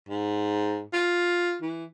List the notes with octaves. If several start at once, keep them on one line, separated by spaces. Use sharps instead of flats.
G#2
F4
E3